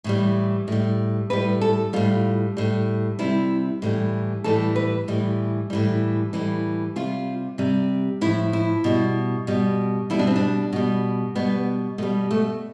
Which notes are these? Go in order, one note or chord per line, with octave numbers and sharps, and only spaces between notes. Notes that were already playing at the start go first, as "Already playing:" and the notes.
A2 E3 G3
A2 G3
A2 G3 B4
A4
A2 G3 F4
A2 G3
C3 G3 E4
A2 E3 G3
A2 E3 G3 A4
B4
A2 E3 G3
A2 E3 G3
A2 E3 G3
C3 G3 F4
C3 G3
A2 F3 E4
E4
B2 G3
B2 G3
B2 G3 E4
D4
C4
D4
B2 G3
B2 G3 B3
B2 G3 A3
A3